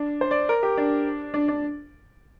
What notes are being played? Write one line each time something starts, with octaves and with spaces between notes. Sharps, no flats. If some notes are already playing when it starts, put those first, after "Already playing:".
Already playing: D4
C5
D5
A#4
G4
D4
D4
D4